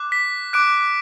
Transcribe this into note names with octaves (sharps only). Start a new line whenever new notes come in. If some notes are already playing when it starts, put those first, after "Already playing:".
Already playing: D6 F#6
B6
D6 F#6 D7